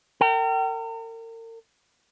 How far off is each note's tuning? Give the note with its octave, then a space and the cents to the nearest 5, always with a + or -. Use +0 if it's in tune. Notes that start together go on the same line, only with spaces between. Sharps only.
A#4 -40 G5 -30